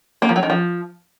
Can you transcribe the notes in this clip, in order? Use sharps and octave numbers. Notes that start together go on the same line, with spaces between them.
A#3
F3
F#3
D#3
F3